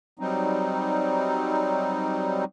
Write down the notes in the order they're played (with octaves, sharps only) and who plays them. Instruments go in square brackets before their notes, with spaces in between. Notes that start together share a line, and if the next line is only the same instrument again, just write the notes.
[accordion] F#3 G3 C4 D#4